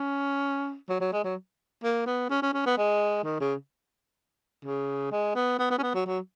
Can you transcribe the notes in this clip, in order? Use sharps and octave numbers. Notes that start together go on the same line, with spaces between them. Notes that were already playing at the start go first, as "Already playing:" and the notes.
Already playing: C#4
F#3
F#3
G#3
F#3
A#3
B3
C#4
C#4
C#4
B3
G#3
D#3
C#3
C#3
G#3
B3
B3
B3
C#4
B3
F#3
F#3